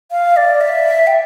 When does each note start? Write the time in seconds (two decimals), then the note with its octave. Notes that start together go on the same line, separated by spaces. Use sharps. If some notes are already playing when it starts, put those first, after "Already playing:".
0.12 F5
0.37 D5
0.61 E5
1.07 G5